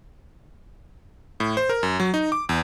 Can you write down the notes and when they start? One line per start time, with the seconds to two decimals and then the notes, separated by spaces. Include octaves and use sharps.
1.40 A2
1.57 C5
1.69 A#4
1.83 F#2
2.00 F#3
2.14 D#4
2.32 D6
2.49 E2